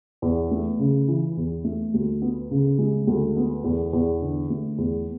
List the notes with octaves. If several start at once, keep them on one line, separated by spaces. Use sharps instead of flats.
E2
A3
C#3
E3
E2
A3
D2
B3
C#3
G#3
D2
B3
E2
E2
D3
A3
E2